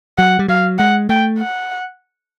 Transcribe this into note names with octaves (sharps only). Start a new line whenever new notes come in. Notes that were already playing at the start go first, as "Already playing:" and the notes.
F#3 F#5
G3
F#3 F5
G#3 F#5
A3 G5
F#5